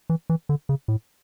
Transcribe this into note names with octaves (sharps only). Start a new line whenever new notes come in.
E3
E3
D3
C#3
A2